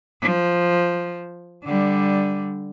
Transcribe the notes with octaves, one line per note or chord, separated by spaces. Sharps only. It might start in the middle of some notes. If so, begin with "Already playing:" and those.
F3
D3 G3